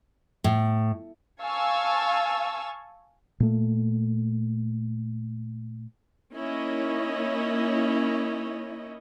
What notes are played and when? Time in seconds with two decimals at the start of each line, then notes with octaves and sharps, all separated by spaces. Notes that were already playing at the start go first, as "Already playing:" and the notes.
0.44 A2
1.42 F5 G#5 A5 C#6 E6
3.40 A#2 A3
6.34 A#3 C#4 D#4 E4 C#5 D#5